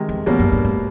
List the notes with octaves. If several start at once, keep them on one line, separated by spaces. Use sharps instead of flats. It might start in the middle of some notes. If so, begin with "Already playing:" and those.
Already playing: C3 D#3 G#3
E2
F2 B2 G3 A#3 C#4
F#2
G2
G#2